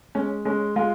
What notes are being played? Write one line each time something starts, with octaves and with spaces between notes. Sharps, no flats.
G#3 C#4
G#3 C#4
G#3 F4